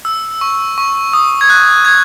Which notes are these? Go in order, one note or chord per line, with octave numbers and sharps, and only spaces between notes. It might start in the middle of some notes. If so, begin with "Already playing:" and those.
E6
C#6
C#6
D#6
G#6
F#6
G#6